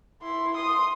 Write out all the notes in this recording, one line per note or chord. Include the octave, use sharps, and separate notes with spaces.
E4 C6
C6 D#6